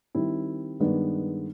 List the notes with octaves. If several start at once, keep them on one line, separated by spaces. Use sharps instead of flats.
D#3 G3 C4 E4
G2 D#3 G#3 B3 D4